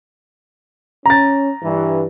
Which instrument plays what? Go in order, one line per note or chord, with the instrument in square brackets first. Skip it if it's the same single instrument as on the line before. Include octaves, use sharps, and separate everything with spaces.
[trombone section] C#4 [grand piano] A#5 A6
[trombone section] G2 E3